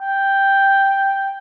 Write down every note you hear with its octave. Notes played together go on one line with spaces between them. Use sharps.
G5